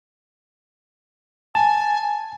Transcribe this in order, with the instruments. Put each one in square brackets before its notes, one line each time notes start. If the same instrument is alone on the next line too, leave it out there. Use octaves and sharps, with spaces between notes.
[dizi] G#5 [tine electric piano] A5